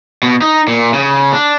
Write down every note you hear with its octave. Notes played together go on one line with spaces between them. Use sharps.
B2
D#4
A#2
C#3
D4